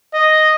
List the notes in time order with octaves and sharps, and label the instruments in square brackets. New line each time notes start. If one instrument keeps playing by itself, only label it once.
[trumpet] D#5